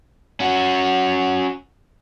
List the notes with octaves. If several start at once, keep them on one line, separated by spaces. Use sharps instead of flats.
C#4 F#4